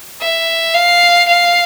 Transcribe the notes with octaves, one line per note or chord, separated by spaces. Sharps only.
E5
F5
F5